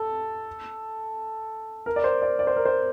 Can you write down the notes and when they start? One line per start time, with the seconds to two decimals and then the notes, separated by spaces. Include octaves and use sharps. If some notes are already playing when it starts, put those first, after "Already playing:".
Already playing: A4
1.86 A#4
1.96 D5
2.04 C5
2.22 D5
2.39 D5
2.47 C5
2.56 A#4
2.65 C5